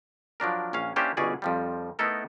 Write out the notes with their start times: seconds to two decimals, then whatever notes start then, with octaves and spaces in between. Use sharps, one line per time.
0.40 F3 F#3 D4 A#4
0.73 A#1 C#4 F5
0.96 A#3 C#4 D4 E4 G4 C5
1.17 G1 B2 C#4 G#4 D5
1.42 F2 F3 G3
1.99 A3 B3 D#4 E4 A4 A#4